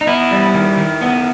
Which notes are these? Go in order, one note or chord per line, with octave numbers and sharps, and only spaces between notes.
D#4
B3 E4
G3
D#3
D#3
B3